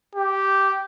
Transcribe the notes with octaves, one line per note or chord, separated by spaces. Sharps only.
G4